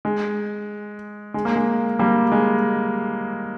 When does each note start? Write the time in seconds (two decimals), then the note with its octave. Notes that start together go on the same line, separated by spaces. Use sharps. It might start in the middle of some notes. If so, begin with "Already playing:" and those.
0.05 G#3
1.34 G#3
1.45 A#3
1.56 G#3
1.99 G3 A#3
2.32 G#3